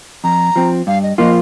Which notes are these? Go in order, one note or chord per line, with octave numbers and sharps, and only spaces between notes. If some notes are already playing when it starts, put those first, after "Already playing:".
F2 A#5
F3 C4
G2 F5
D#5
F3 A#3 F4 D#5